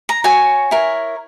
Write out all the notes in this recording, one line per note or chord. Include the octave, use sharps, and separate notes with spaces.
A#5
F#4 C#5 G#5
E4 A#4 C#5